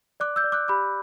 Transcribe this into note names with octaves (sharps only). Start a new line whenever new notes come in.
D5 D6 F#6
E6 G6
D5
D6 F#6
G4 B5 D6